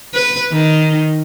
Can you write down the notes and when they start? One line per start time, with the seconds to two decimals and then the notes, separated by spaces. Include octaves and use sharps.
0.14 B4
0.52 D#3